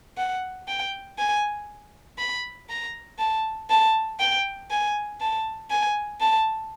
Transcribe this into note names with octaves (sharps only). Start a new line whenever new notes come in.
F#5
G5
G#5
B5
A#5
A5
A5
G5
G#5
A5
G#5
A5